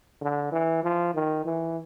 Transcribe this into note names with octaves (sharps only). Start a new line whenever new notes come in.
D3
E3
F3
D#3
E3